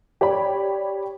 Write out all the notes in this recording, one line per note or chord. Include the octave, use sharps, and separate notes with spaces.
G4 C#5 D5 B5